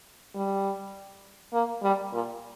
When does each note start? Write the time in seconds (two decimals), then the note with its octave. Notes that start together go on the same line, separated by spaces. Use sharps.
0.35 G3
1.53 A#3
1.83 G3
2.12 A#2